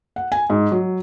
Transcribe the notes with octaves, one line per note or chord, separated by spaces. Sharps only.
F#5
G#5
G#2
F#3